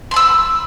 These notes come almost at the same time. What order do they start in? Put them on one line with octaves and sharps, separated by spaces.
C6 B5 E6